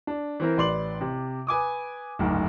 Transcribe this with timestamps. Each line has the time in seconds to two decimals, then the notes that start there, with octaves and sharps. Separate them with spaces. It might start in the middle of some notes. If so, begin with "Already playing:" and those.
0.07 D4
0.40 E3 C4 A#4
0.57 A1 B4 D5 C6 D6 F#7
1.01 C3
1.47 B4 G#5 D6 D#6
2.19 F#1 D2 G#2